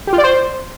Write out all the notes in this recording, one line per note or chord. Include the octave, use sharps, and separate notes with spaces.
G4
F4
D5
C5